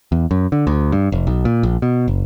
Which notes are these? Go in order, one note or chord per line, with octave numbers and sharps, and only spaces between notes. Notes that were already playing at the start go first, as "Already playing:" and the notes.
E2
F#2
D3
D2
G2
F1
B1
A#2
A#1
B2
F#1